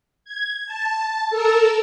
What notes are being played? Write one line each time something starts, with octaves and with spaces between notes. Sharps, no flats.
G#6
A5
A4 A#4 E6